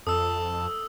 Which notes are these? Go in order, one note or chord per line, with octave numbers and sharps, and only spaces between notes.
F2 A4 A5 D#6 E6